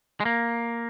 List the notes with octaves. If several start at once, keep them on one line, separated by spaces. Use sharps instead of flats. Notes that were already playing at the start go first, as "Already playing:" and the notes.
G#3
A#3